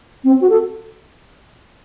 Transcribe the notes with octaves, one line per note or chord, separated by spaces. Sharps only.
C4
F#4
A4